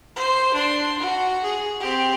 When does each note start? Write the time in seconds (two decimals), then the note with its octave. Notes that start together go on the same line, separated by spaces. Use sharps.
0.16 C5
0.54 D4 C6
1.00 F#4
1.44 G#4
1.80 C4 G4